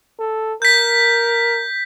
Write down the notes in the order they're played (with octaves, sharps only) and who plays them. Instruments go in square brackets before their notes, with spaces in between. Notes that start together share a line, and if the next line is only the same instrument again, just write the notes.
[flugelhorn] A4
[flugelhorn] A#4 [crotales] G6 B6